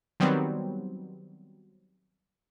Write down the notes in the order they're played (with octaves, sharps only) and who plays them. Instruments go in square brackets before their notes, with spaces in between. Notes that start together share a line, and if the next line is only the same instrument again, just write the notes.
[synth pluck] D#3 F#3 G3 B3 C4